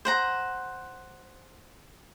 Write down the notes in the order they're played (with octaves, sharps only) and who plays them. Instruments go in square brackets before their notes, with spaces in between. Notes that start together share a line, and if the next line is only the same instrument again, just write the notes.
[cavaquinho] C5 F#5 A#5